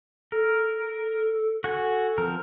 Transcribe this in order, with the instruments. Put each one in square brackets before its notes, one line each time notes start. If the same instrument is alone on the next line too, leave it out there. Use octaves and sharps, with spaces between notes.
[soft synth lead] A4 [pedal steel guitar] A#4
[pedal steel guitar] F#4 F#5 G#5 [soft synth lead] A4
[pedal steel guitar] F3 C4 A#4